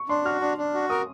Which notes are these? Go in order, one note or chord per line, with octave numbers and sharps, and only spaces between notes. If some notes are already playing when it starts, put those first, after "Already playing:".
Already playing: C#6
D4 C6
F#4 F6
D4
D4
F#4
A#4 D#6